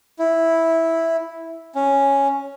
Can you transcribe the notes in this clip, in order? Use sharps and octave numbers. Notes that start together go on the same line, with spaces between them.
E4
C#4